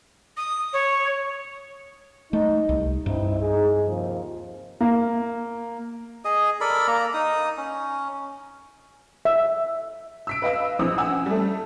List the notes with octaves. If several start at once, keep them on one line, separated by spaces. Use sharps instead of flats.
D#6
C#5
A3 D#4
C2
G2 C4 D#4 E4
D#4 G#4
D#2 C3 F3
A#3
G#4 D#5
A4 A#4 D5 B5
A#3 A#5
D#4 D#6
C#4
E5
E6 B6 D7
B4 D#5 F5 E6
A#1 E3 C4 D#6 E6
F#5 G#5 D#6 E6
C#4
G3 A3